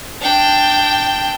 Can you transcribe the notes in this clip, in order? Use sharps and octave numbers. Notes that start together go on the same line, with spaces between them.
D4 G5